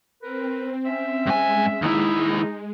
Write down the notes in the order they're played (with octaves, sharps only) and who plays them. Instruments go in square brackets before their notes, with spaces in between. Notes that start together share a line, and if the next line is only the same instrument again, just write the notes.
[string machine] C4 [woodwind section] A#4 B4
[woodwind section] C#4 E5
[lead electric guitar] G2 G#5 [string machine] G#3
[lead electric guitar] D#2 E4 [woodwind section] D#4